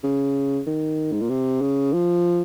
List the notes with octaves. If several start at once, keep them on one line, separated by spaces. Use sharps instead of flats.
C#3
D#3
G#2
A#2
C3
C#3
F3